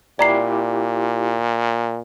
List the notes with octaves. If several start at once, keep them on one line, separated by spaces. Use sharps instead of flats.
A#2 E4 G4 D5 A#5 C7